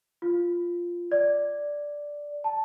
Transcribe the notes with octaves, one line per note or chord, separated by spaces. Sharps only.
F4
D5
A5